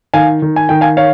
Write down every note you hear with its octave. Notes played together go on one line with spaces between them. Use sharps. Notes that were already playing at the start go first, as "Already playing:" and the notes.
D#3 F5 G#5
D#3
G#5
D#3 G5
F5 G#5
C#5 F5